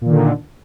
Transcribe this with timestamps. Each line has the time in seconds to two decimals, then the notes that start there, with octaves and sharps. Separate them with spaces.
0.01 A#2
0.06 D#3
0.11 D3